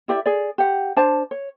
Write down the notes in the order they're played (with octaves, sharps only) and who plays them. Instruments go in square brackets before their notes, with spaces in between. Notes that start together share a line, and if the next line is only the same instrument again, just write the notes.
[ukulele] E4 G4 D5 E5
G#4 D5
G4 F#5
D4 C5 A5
C#5